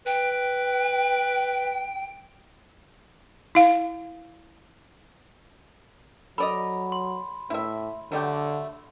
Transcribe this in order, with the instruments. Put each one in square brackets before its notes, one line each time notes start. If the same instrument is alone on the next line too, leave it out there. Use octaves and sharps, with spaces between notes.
[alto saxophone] B4 [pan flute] G5
[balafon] E4 F5
[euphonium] F#3 [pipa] A4 D5 D#5 [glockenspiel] B5
[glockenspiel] C6
[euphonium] A2 [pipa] E4 E5
[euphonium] D3 [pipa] F#3 A3 G4